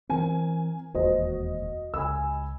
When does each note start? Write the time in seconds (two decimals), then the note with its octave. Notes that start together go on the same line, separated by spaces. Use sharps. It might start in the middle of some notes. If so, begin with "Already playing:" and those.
0.09 E3 C4 A#4 G#5
0.94 E1 D#2 F#4 C5 D#5
1.94 C#2 G#5 B5 E6